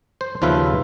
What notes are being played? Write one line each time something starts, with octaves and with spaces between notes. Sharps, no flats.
C5
D#2 C#3 F3 F4 B4 E5